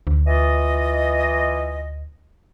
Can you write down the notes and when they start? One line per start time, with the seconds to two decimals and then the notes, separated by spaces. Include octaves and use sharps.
0.07 D2
0.27 E3 F4 D#5